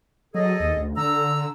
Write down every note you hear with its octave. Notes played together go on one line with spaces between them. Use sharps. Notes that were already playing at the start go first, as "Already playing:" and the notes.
F#3 G#4 A4 D#5
D#2
D2
D3 A#5 E6